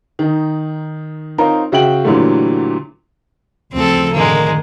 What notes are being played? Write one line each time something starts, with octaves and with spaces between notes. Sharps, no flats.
D#3 D#4
C4 D#4 F4 A#4 C5 C#5
C#3 F#4 E5 G5 D7 F#7
A#2 D3 E3 F#3 G3 A3
D2 C#3 F3 C4 A4
A2 D3 D#3 G#3 A#3